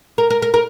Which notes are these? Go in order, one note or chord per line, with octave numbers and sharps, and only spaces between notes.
A#4
A#4
A#4
A#4